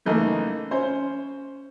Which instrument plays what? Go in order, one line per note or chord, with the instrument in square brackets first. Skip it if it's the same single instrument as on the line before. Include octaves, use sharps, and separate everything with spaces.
[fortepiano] F#2 C#3 E3 A3 A#3 D#4
C#4 C5